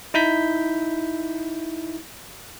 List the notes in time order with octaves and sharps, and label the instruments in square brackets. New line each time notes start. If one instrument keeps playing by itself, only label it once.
[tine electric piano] D#4 E4 G6 B6